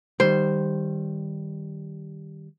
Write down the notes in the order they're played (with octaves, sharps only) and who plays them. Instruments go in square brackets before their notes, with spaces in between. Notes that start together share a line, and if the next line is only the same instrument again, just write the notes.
[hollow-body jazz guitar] D#3 G3 [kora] C5